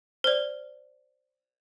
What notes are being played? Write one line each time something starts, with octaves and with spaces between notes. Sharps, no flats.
C5 D5